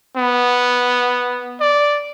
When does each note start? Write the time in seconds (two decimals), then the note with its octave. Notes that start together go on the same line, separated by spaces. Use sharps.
0.16 B3
1.60 D5